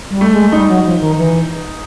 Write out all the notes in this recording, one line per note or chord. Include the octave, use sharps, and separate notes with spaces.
G3
A3
G#3
G3 D#4
F#3
F3
D#3
E3